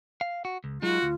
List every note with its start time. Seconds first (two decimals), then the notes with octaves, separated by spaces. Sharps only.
0.21 F5
0.45 F#4
0.64 C#2
0.82 F#3 G#3 D#4 F4 F#4
1.03 D2